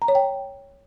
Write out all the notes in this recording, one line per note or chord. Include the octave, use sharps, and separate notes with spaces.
A#5
C#5
G5